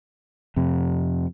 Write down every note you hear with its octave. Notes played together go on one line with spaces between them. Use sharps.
F2 C3